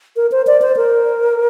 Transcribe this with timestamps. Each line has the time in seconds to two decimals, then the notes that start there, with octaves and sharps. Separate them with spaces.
0.16 A#4
0.32 C5
0.47 D5
0.62 C5
0.77 A#4